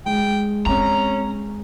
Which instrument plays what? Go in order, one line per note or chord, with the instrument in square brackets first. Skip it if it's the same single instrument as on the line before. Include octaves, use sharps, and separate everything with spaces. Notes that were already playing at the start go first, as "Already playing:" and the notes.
[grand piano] G#3 [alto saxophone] G5
[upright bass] C4 [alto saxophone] C#4 [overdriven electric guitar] A#5